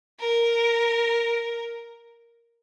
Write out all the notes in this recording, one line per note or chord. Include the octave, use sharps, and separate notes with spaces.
A#4